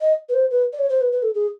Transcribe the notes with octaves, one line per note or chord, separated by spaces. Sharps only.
D#5
B4
C5
B4
D5
C#5
C5
B4
B4
A4
G#4